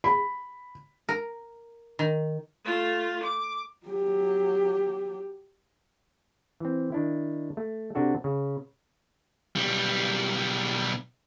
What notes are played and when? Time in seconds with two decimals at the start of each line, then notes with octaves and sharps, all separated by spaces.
0.04 B5
1.09 A#4
1.99 D#3
2.64 A3 F4
3.23 D6
3.87 F#3 G4
6.60 E3 C4
6.92 D#3 D4 E4
7.57 A3
7.95 C3 D4 F#4 A4
8.24 C#3
9.55 B1 G3